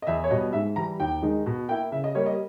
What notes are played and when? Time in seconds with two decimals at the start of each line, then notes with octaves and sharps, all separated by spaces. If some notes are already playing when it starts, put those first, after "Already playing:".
0.02 D#5
0.07 E2 E5
0.24 C#5
0.31 B2 G3 D#5
0.53 G#2 E5
0.76 E3 G3 A#5
1.00 D#2 G5
1.22 D#3 G#3 D#4
1.46 B2
1.68 A#3 E4 G5
1.91 C#3 E5
2.04 D#5
2.15 G3 A#3 C#5
2.26 D#5